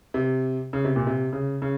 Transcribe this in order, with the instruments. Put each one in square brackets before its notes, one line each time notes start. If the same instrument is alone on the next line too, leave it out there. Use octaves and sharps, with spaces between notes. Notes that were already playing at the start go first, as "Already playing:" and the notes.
[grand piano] C3
C#3
C3
A#2
C3
C#3
C#3